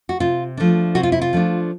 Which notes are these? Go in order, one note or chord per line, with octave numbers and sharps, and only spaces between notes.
F#4
C3 F4
F3 A3 D4
C3 F#4
F4
E4
F4
F3 A3 D4